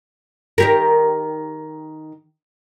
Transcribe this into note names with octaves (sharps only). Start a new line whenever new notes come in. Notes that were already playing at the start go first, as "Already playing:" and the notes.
D#3 G4 A#4